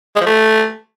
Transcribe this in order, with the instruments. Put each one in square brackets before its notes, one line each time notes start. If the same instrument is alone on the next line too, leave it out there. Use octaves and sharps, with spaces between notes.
[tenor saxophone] G#3
F3
A3